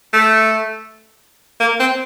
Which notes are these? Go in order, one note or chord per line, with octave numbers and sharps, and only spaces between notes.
A3
A#3
C4